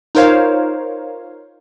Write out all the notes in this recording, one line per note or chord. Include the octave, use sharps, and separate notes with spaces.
D#4 F4 A#4 C5 C#5 F5